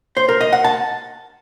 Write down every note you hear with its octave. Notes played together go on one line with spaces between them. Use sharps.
C5
A#4
D#5
F#5
A5